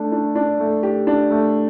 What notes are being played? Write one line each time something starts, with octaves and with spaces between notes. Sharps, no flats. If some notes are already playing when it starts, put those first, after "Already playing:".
Already playing: A3 D4
D4
D4
A3
G4
D4
A3